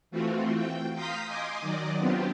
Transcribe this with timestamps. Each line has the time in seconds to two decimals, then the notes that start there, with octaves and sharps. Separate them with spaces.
0.11 E3 A3 C4 F4 F#4
0.55 G5
0.94 F5 A#5 C6 D#6 G6 B6
1.27 D#5 G#5 C6 D6
1.61 D#3 F#3 D5 D#5
1.98 F#3 B3 C4 D4 F4 G4